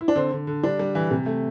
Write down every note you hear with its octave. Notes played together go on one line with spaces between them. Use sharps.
E4
D4
D3 C4
D3
D3
G3 D4
G3
E3
C3
A3